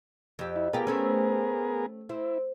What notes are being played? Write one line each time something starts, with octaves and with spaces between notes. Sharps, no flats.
F2 G4
E4
B3 F4 G4 G#4 A#4
A3 C4 C#4
C4 E4